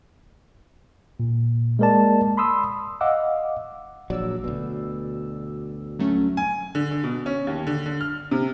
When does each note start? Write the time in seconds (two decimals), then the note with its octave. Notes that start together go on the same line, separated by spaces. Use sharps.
1.20 A#2
1.79 G#3 A#3 A#4 D5 A5
2.37 B5 C6 D#6 E6
3.01 D#5 F5 F#5 D6 E6
4.10 A#1 F#3 D5 E6
4.44 D2 B2
5.99 F#3 A3 C#4
6.37 G#5
6.75 D3
6.91 D3
7.04 B2
7.26 C#4
7.47 D#2
7.67 D3
7.86 D3
8.01 F6
8.31 C3